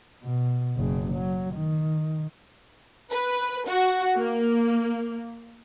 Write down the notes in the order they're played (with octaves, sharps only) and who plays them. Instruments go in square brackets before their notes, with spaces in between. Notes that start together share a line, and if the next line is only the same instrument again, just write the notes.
[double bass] B2
F#1 C#3
F#3
D#3
[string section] B4
F#4
A#3